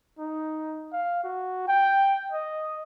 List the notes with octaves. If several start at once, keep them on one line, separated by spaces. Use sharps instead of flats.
D#4
F5
F#4
G5
D#5